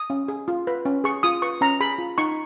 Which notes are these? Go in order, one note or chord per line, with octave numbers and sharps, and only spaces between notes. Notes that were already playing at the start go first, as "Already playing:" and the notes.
Already playing: D#6
C#4
G#4
F4
B4
C#4
G#4 C#6
F4 D#6
B4 C#6
C#4 A#5
G#4 B5
F4
D#4 C#6